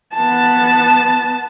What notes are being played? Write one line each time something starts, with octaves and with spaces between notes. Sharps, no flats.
B3 A5